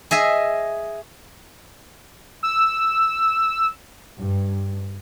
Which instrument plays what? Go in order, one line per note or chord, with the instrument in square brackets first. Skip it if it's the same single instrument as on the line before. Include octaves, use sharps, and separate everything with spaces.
[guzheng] G#4 D#5 E5
[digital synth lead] E6
[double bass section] G2